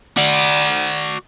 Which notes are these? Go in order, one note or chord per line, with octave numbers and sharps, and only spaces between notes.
F#4 D5